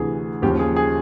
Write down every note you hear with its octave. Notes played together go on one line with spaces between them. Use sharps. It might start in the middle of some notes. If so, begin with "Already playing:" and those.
Already playing: D2 C3 E3 G#4
D#2 C#3 F3 G4
G#4
G#4